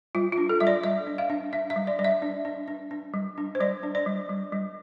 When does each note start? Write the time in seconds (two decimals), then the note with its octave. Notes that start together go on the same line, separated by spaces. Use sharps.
0.15 G3 F4
0.32 F4
0.38 D4
0.49 A4
0.60 G3 E5
0.67 D5
0.84 G3 E5
1.07 D4
1.18 F5
1.30 D4
1.53 D4 E5
1.70 E5
1.76 G3
1.87 D5
1.99 G3 D5
2.04 E5
2.22 D4
2.45 D4
2.68 D4
2.91 D4
3.14 G3
3.38 D4
3.55 C5
3.60 G3 D5
3.83 D4
3.95 D5
4.06 G3
4.29 G3
4.52 G3